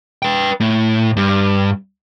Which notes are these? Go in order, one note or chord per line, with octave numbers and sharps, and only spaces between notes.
B4 G5
A2
G2